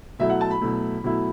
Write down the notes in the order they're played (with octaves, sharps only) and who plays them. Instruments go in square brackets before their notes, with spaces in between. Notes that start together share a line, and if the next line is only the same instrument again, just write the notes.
[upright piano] B2 F#3 A3 E4 E5
F#5
A5
B5
B2 F#3 A3 E4
B2 F#3 A3 E4